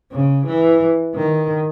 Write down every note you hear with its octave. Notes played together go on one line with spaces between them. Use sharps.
C#3
E3
D#3